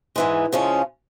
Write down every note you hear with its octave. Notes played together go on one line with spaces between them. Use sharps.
G#2 E3 G#3
C#3 F3 G#3 C#4